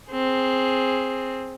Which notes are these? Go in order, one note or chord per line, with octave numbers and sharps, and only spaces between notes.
C4 G#4